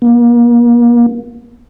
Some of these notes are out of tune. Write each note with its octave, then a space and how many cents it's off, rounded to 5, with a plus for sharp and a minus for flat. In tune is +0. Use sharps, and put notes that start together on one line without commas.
A#3 +35